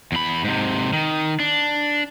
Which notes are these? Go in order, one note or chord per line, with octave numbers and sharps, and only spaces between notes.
E2 B5
G#2 C3
D#3
D4